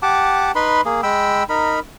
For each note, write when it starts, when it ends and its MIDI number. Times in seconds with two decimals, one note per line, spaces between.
0.03 0.52 67
0.03 0.52 78
0.03 0.52 81
0.03 0.52 86
0.55 0.81 63
0.55 0.81 71
0.55 0.81 83
0.55 0.81 84
0.85 1.01 58
0.85 1.01 68
1.03 1.43 56
1.03 1.43 79
1.03 1.43 83
1.03 1.43 88
1.49 1.79 63
1.49 1.79 70
1.49 1.79 83